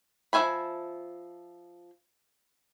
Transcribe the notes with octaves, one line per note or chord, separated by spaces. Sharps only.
F3 F4 E5 G#5 B5